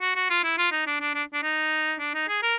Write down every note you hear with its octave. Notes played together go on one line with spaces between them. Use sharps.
F#4
F#4
F4
E4
F4
D#4
D4
D4
D4
D4
D#4
D4
D#4
G#4
A#4